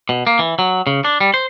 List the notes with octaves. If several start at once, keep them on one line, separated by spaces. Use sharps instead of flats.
B2
A#3
E3
F#3
C#3
D4
G3
C5